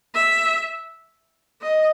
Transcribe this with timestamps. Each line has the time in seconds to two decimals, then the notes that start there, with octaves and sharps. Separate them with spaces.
0.15 E5
1.62 D#5